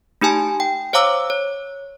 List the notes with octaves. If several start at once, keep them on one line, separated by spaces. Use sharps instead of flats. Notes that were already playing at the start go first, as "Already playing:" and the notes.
A3 D#4 G4 G#5 A5
G5
C5 C#5 F5 A#5 D6 E6
C#5